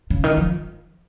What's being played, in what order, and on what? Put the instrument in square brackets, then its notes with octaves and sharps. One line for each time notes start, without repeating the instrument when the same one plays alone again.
[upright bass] C#3
D#3
F3